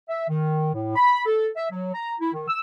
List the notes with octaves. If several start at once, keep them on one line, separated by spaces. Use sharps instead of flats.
E5
D#3
A2
B5
A4
E5
F#3
A#5
E4
D#3
E6